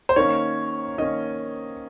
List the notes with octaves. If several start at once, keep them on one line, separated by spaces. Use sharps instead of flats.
C5
D#3 A#3 C#4 C#5
D#3 A#3 C#4 D#5